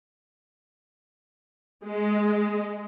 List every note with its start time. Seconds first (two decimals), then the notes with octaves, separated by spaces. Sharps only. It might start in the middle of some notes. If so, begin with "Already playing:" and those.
1.84 G#3